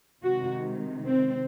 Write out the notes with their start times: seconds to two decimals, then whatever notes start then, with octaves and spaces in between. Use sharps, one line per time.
0.22 C3 D#3 G#3 F#4
1.07 C4